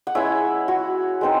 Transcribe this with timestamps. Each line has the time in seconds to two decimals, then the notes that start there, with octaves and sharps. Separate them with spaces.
0.07 F#5
0.15 G#3 C#4 E4 C#5 E5
0.68 F#4
1.21 G#3 C4 D#4